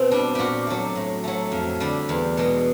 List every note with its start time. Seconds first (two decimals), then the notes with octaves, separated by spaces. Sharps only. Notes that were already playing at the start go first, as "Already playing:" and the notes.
Already playing: B2 C4
0.11 G3 D4
0.35 A#2 F#4 G4
0.67 F#3 A3
0.96 A2
1.24 F#3 A3
1.52 F2
1.80 D3 G3
2.09 E2
2.37 B2 G#3